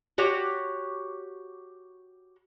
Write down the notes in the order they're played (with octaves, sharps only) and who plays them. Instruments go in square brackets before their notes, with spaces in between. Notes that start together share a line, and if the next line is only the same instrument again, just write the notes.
[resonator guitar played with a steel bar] F#4 G4 C#5